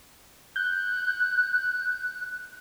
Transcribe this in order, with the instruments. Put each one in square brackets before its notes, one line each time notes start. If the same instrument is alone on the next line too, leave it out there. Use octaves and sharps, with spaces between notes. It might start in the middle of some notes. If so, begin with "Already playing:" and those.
[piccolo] F#6 [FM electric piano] G6